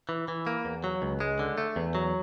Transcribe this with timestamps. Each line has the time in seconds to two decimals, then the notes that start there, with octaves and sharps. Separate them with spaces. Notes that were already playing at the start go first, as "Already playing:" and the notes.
0.09 E3
0.28 E3
0.47 A#3
0.65 E2
0.84 F#3
1.02 C#2
1.20 G#3
1.39 D3
1.58 A3
1.76 E2
1.95 F#3